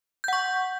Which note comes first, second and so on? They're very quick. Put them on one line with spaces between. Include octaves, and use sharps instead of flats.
G6 F#5 C#6